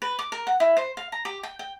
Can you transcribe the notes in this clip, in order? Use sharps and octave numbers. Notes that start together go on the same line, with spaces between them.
B4
D6
A#4
F#5
E4
C5
F5
A#5
G4
G5
G5